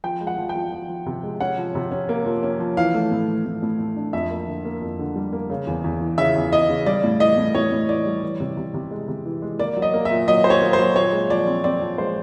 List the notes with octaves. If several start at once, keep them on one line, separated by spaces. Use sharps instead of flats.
F3 G5
G#3
F#5
F3
G5
F3
F3
F3
C3
G#3
C#4 F#5
F3
C3
C#4
A#3
F3
C#4
F3
E3 F5
A3
A2
E3
A2
A2
A2
D4
F2 E5
A#3
D3
A#3
F2
D3
G3
A#3
C#3
E2
E2
E3
C#3 E5
E2
E3 D#5
C#3
G3 D5
A2
E3 D#5
A2
A2 C#5
A2
E3 D5
G3
E3
C3
C3
C3
G#3
C3
E3
G#3
A#3 D5
F#3
D#5
A#3
E5
A#2
F#3 D#5
A#2 C5
C#5
A#3
C5
F#3
A#2 C#5
G#3
F3 D5
C4
C4 D5
F3
G#3 C5